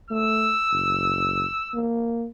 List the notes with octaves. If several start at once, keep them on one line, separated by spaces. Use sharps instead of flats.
A3 E6
F#1
A#3